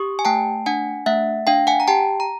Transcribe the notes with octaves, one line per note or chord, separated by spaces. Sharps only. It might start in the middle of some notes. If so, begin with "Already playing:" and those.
Already playing: G4 C#6 D#6
G#5
A3 G5 A5
D4 F#5 G#5
A3 E5 F#5
D4 F5 G5
F#5 G#5
A#5
G4 G5 A5
A#5